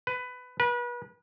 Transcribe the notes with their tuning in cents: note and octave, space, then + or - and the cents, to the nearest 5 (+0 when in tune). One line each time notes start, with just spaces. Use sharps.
B4 +15
B4 -35